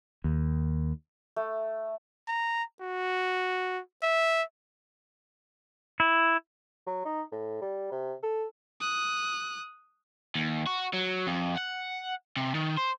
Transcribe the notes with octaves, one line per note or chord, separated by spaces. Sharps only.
D#2
A3
A#5
F#4
E5
E4
F#3
D#4
A2
G3
C3
A4
D#6 F#6
D#2
F#4
F#3
F2
F#5
C3
D#3
C5